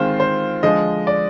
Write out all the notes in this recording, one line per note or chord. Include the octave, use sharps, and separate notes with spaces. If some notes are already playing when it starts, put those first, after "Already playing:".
Already playing: D#3 G#3 C4 F4 C5
C5
D3 F3 G#3 D#5
D5